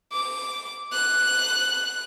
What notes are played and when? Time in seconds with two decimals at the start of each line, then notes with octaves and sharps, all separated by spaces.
0.13 D6
0.92 F#6